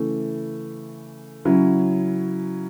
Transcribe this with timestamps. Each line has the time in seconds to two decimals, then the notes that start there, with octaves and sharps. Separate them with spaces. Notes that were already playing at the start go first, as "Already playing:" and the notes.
Already playing: C#3 E3 A3
1.45 C#3 F#3 C#4 E4